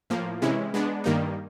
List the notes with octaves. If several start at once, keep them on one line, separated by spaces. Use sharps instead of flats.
A2 F3 A#3
C3 E3 G#3 C#4 E4
G#3 B3 D4
G2 D#3 G3 A#3 D#4